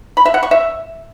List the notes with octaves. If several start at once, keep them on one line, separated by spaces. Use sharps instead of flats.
B5
E5
F#5
C#6
E5